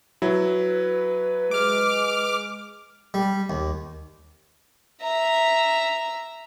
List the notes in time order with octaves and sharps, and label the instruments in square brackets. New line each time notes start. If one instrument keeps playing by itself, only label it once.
[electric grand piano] F#3 E4 [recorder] B4
[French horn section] G#3 [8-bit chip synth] D6 F6
[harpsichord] G3
D#2
[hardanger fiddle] E5 A#5